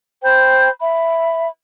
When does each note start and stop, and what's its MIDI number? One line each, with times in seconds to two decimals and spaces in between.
0.23 0.69 72
0.23 0.69 79
0.23 0.69 83
0.23 0.69 91
0.81 1.48 76
0.81 1.48 83